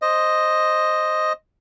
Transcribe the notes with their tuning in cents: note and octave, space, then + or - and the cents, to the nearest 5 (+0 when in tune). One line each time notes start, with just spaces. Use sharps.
C5 +5 D#5 +0